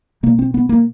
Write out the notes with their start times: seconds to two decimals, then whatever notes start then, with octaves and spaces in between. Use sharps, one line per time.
0.23 B2 A#3
0.39 C4
0.54 B3
0.69 A#3